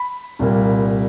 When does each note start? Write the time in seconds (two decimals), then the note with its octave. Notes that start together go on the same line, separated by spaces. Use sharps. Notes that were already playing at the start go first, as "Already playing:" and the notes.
Already playing: B5
0.39 C2 A#2 G3 A#3